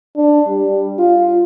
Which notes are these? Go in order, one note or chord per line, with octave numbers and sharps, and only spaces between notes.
D4
G3
F4